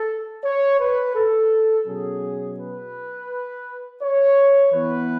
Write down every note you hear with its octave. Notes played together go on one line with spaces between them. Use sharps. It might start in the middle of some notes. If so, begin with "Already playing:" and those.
Already playing: A4
C#5
B4
A4
B2 F#3 C#4 G#4
B4
C#5
E3 B3 B4